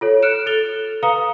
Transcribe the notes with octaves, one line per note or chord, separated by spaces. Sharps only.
F4 A4 C#5
F6 F#6 C#7 D7 E7
A4 A6 F7 G7
B4 F5 A#5 D#6 C#7 G7